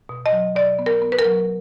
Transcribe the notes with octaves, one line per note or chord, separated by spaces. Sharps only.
B2
D#5
F#3
B2 D5
B3
A#4
B3
B4
A#4
F#3